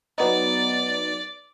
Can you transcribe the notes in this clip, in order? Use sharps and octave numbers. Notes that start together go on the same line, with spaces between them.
F#3 B3 D#4 D5